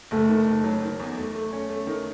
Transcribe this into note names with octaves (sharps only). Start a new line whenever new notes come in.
F#1 A3
D#3
F#1
F#3
D#3
E2
A3
A3
C#4
A3
D#3